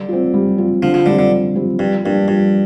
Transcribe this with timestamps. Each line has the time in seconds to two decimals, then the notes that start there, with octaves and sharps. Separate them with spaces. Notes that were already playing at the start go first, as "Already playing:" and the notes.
Already playing: D3 G3
0.09 C4 F4
0.34 G3
0.58 C4 F4
0.83 D3 F3
0.94 F3
1.06 D3 G3 C4 F4
1.19 D3
1.31 D3
1.55 G3 C4 F4
1.79 G2 F3
2.04 G2 A#3 D4
2.28 G2 F3